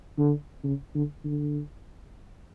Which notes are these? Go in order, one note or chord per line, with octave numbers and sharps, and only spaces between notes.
D3
C#3
D3
D3